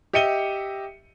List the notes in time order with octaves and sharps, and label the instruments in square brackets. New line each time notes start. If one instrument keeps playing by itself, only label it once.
[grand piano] G4 D#5 E5 C#7 D#7 G7